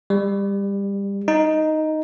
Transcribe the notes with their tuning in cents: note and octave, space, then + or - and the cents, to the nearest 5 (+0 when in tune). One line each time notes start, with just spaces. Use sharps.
G3 +25
D#4 +0